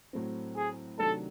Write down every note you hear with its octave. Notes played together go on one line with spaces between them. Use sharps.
A2 F#3 A3 C4
G#4
C3 D#3 F#3 A3 D4 A4